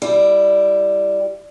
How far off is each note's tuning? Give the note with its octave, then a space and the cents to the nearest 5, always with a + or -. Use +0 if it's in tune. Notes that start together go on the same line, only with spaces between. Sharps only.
G3 +5 E4 +15